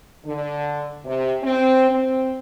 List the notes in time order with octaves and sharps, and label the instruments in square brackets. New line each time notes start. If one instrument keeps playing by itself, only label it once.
[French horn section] D3
C3
C4
C4